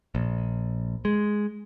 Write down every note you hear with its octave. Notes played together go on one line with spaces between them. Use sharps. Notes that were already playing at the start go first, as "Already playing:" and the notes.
A#1
G#3